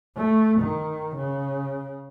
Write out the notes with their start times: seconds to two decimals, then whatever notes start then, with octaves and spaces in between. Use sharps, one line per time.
0.16 A3
0.60 D#3
1.16 C#3